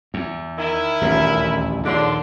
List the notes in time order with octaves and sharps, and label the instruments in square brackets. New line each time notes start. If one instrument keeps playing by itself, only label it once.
[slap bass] E2
[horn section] D#3 E4
[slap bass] D#1 A1 D2
[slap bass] A#1 D#2 D#3 [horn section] D3 D4 C6